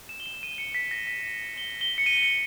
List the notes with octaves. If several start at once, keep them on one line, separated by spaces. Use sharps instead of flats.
E7
G7
E7
D#7
C#7
B6
A#6
B6
G7
G7
C#7
D#7
D#7
C#7